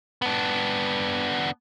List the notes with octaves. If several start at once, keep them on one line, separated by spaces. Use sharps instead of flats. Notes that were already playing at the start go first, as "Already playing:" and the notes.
B3 D4